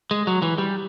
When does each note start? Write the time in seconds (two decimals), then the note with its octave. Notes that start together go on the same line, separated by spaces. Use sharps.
0.11 G#3
0.27 F#3
0.42 E3
0.58 G3